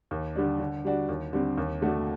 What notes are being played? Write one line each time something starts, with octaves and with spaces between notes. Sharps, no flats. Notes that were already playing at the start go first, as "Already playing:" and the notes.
D#2
D3 G3 D4
D3
G3 D4 F#4
D#2
D3 G3 C4
D#2
D3 A3 D4 F#4